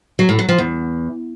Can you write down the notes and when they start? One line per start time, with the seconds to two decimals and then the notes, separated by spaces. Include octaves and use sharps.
0.19 F#3
0.29 A2
0.39 F#3
0.49 F3
0.58 E2